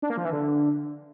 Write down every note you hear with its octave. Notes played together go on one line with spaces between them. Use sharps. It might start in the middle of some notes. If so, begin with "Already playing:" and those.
D4
A#3
F3
E3
D3